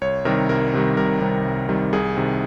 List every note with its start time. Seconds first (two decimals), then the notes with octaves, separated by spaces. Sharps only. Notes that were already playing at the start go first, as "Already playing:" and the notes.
0.01 C2 C#5
0.25 C3 D#3 G3 A#4
0.49 C2 A#4
0.73 C3 D#3 G3
0.97 C2 A#4
1.21 C3 D#3 G3
1.45 C2
1.69 C3 D#3 G3
1.93 C2 G#4
2.17 C3 D#3